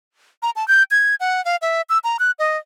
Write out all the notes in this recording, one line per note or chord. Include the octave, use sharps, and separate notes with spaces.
A#5
A5
G6
G#6
F#5
F5
E5
E6
A#5
F#6
D#5